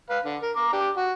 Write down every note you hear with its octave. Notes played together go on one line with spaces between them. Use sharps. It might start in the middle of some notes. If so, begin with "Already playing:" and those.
B4 F5
D3
A#4
A#5 D6
D4 G4
F#4